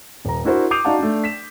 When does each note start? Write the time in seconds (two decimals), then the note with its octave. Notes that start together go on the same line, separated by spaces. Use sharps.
0.25 D#1 A#5
0.44 D4 E4 F#4 A#4 C5 D5
0.71 D6 D#6 G6 C7 D#7 F7
0.85 D#4 F#4 D5 F5 F#5 A5
0.99 A3 D4
1.24 B6 E7